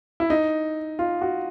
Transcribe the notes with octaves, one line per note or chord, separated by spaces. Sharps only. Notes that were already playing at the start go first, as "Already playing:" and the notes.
E4
D#4
F4
F#4